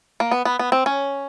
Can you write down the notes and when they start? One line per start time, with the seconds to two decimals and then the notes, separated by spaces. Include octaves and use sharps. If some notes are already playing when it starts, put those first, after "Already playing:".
0.20 A#3
0.31 B3
0.45 B3
0.59 B3
0.72 C4
0.86 C#4